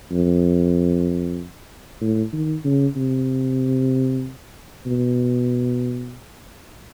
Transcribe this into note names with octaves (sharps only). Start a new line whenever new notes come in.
F2
A2
D#3
C#3
C3
B2